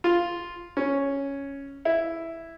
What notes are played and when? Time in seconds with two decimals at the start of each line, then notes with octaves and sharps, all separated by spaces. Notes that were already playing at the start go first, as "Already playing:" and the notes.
0.04 F4
0.77 C#4
1.85 E4